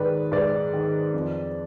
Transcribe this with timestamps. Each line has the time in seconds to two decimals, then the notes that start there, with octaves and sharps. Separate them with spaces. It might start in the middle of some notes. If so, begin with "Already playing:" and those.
Already playing: G#2 D#3 B4 D5
0.32 G#2 B4 D5
0.74 D#3
1.14 F2